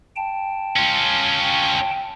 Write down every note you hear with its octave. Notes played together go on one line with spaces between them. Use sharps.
G5 A5
C#4 F4